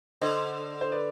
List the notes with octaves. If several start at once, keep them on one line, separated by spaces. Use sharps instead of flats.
D3 C5 D#5
C5
B4 D5